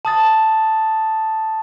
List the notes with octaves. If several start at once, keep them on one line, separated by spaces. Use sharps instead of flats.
A5 D#6 A6